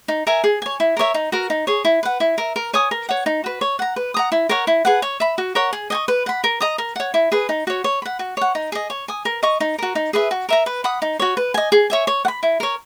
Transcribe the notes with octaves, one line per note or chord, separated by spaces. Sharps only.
D#4
A#4 E5 G#5
G#4
C#5 G#5
E4
A#4 C#5 E5
D#4
F#4 A#4
D#4
G#4 C#5
E4
B4 F#5
E4
A#4 E5
A#4
C#5 G#5 D#6
A#4
C#5 F#5
D#4
F#4 B4
C#5
F#5 A#5
B4
F#5 A#5 D#6
E4
A#4 C#5 F#5
E4
G#4 B4 F#5
C#5
E5 B5
F#4
A#4 C#5 F#5
G#4
D#5 G#5 C#6
B4
F#5 B5
A#4
D#5 A#5 D#6
A#4
C#5 F#5
E4
G#4 B4
D#4
F#4 C#5
C#5
F#5 B5
F#4
C#5 F#5
D#4
G#4 D#5
C#5
G#5 D#6
A#4
D#5 A#5 C#6
D#4
F#4 A#4
D#4
G#4 B4 E5
F#4
A#4 E5 A#5
B4
F#5 B5 D#6
D#4
F#4 C#5
B4
D#5 G#5
G#4
C#5 E5 G#5
C#5
F#5
B5
E4
A#4 C#5